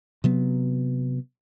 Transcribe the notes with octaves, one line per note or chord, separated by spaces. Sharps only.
C3 F#3 B3